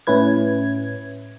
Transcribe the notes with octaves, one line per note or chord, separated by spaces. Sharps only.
A2 C#4 E4 B4 G#6